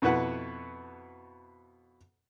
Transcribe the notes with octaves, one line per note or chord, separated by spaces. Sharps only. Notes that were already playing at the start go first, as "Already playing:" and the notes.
F2 B2 E4 B4 F#5